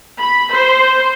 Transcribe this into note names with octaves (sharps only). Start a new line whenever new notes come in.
B5
C5